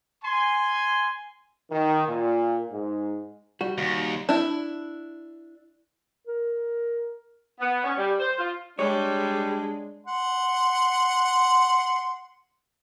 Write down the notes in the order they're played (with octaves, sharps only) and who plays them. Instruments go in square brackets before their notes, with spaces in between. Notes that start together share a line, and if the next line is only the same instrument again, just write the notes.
[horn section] G#5 C6
[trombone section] D#3
A#2
G#2
[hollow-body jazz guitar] G3 F#4
[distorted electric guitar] D#2
[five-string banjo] D4 E4
[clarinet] A#4
[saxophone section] B3
C#4
G3
C5
F4
[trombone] G3 [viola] G#3 [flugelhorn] D4 [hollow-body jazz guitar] C#5
[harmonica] F#5 C6